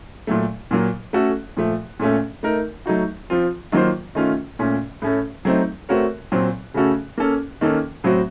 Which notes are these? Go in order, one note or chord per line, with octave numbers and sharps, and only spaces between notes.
A#2 F#3 A3
A#2 F#3 A#3
A3 C#4 F#4 A4
A#2 F3 A3
A#2 A3 C#4 A4
A3 D#4 A#4
F#3 A3 D#4 F#4
F3 C4 F4
D#3 F#3 A#3 F4 C5
D#3 A3 C#4 F4
A#2 A3 C#4
A2 A3 C#4 A4
F#3 A3 C4 D#4
A3 C4 F#4 A#4 C#5
A#2 F#3 C4
C#3 A3 C#4 F#4 A4
A#3 C#4 A4
D#3 A#3 C#4 A4
A2 F#3 C4 F#4